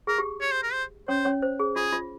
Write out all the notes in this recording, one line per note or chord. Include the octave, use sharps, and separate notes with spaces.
G#4 A#4
G4
C#5
C5
A#4
C5
C#4 C5 C#5
C#4 C#5
C5
G#4
F4 G#4
F4